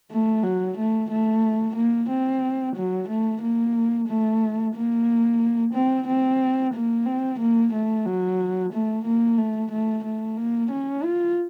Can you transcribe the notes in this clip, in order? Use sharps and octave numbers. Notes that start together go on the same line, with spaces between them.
A3
F#3
A3
A3
A#3
C4
F#3
A3
A#3
A3
A#3
C4
C4
A#3
C4
A#3
A3
F#3
A3
A#3
A3
A3
A3
A#3
C#4
F4